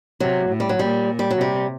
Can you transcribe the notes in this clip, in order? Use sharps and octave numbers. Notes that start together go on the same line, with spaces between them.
C3 F#3
A2
G3
F#3
A#2 G3
G3
F#3
C3 G3